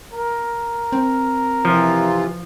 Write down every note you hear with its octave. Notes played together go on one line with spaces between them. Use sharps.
A#4
C4
C3 E3 F3 F4